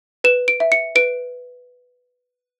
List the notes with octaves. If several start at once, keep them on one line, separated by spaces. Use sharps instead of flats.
B4 E7
D7
E5
C#7
B4 D7